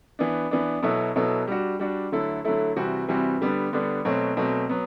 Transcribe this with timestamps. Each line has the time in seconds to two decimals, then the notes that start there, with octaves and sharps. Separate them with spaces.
0.19 E3 B3 D4
0.51 E3 B3 D4
0.83 B2 F#3 B3 E4 A4
1.15 B2 F#3 B3 E4 A4
1.48 G3 D4 F#4
1.80 G3 D4 F#4
2.12 D3 F#3 A3 E4 A4
2.45 D3 F#3 A3 E4 A4
2.76 C3 E3 G3 C4 F#4
3.08 C3 E3 G3 C4 F#4
3.41 D3 G3 B3 D4
3.73 D3 G3 B3 D4
4.05 B2 F#3 A3 C4
4.37 B2 F#3 A3 C4
4.69 F#3 B3